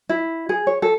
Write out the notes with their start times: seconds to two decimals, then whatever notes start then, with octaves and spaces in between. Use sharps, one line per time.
0.09 E4
0.49 G#4
0.67 C#5
0.82 A4